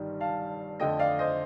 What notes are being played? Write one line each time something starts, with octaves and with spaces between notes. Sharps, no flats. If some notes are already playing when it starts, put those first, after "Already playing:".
Already playing: G1 G2 D#3 G3
F5 A5
F2 D3 A3 D#5 G5
D5 F5
C5 D#5